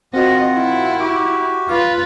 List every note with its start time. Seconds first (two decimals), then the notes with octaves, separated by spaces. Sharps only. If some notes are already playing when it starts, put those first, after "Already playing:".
0.14 D#3 C4 F4 F#4 D#5 F#5
0.53 E4
1.00 F#4 G4 D6
1.69 F4 B4 F5